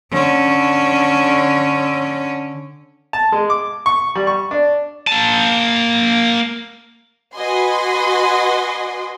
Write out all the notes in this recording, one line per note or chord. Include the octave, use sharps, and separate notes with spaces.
D3 C#4
A5
G#3
D6
C#6
G3
C#6
D4
A#3 A5
F#4 B4 D#5 G#5 C6